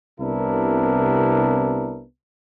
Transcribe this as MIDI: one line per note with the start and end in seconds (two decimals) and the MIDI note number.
0.20 2.04 36
0.20 2.04 48
0.20 2.04 59
0.20 2.04 62
0.20 2.04 64
0.20 2.04 70